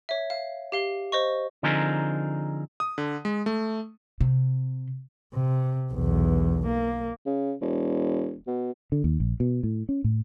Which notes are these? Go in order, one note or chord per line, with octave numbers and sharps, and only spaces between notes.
C#5 E5
F5
G4 F5 G7
C5 D#5 C#6
D3 F3 C4 D#4 G#4 A#4
D#6
D3
G#3
A3
C3
C3
B1 E2
A#3
C#3
E1
B2
D3
D#2
A#1
B2
A2
C#4
A2